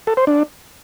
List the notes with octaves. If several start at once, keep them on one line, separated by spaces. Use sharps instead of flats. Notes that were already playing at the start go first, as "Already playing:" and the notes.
A4
C5
D4